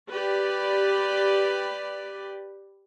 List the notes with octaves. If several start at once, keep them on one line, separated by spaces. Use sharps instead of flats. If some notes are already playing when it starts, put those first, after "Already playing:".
G4 B4 D5